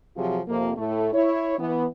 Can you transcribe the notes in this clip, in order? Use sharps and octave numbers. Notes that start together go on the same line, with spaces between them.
C3 F3 F#3 F4 G#4
F2 C3 F3 A#3
A2 A3
E4 C#5
E3 B3